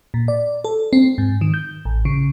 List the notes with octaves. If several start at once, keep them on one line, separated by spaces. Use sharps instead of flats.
A#2
D5
A4
C4
G#2
D#3
G6
A1
C#3